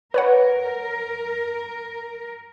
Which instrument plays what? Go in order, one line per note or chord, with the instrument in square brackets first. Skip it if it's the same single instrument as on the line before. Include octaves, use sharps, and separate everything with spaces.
[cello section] A#4 [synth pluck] B4 C#5 F#5